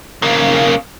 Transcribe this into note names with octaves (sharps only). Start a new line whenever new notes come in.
C#3 A#3